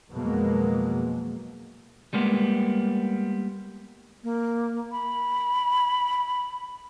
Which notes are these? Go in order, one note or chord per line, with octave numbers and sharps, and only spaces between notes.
F2 B2 F#3 G#3 A#3
G3 G#3 A#3 B3
A#3
B5